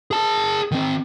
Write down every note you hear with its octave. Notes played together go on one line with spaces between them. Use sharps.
G#4 A5
D#3 C4